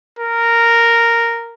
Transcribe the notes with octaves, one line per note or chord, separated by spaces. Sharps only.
A#4